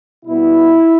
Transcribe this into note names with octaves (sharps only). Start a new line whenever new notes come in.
B2 G3 B3 E4